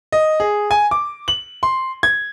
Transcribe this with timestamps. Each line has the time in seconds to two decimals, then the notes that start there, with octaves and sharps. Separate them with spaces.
0.12 D#5
0.40 G#4
0.71 G#5
0.91 D6
1.28 F#7
1.63 C6
2.03 G#6